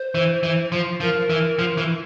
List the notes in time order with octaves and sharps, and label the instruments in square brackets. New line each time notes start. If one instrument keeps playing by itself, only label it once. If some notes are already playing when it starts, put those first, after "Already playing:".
Already playing: [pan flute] C5
[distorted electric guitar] E3
E3
F3
[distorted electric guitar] F3 [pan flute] A#4
[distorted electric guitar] E3
F3
E3